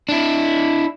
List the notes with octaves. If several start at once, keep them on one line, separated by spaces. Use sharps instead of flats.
D4 E4